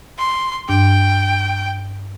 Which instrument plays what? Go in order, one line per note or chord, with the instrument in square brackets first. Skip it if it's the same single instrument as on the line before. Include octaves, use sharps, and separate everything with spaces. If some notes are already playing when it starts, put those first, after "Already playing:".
[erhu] C6
[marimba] G2 D4 [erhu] G5